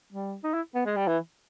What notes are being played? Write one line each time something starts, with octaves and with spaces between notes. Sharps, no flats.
G3
D#4
E4
B3
G#3
G3
E3